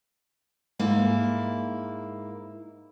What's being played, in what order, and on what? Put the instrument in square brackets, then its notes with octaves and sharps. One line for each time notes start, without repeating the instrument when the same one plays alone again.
[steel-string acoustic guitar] G#2 A#3 E4